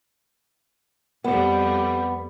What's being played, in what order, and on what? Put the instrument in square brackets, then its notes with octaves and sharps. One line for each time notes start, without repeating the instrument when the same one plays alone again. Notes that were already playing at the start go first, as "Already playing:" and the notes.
[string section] F2 G3 [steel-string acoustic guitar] B3